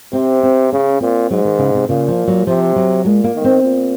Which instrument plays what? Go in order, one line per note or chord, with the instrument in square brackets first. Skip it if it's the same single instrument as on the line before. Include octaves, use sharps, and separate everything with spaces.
[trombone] C3 [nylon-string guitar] C4
[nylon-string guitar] C4
[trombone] C#3 [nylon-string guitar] C#4
[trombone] A#2 [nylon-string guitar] C4
[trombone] G#2 [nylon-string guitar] F#3
[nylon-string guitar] D#3
C#3
C3
[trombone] A#2 [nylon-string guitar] C#3
[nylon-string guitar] F3
F#3
[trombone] C3 [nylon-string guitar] F3
[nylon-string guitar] F#3
[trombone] A#2 [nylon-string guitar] G#3
[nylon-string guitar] A#3
[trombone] D#3
[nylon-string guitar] C4
[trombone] A#2